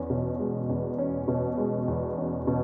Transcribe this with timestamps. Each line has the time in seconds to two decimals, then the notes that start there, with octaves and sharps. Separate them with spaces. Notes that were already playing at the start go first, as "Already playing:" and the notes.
Already playing: E2 C#4
0.10 B2
0.39 G#3
0.69 E2
0.98 C#4
1.28 B2
1.58 G#3
1.88 E2
2.18 C#4
2.47 B2